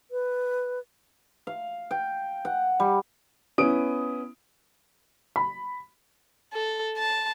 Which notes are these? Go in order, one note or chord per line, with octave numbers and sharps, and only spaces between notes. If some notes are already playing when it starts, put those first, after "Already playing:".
B4
F5
G5
F#5
G3
B3 C#4 E4 D#6 D7
B5
A4
A5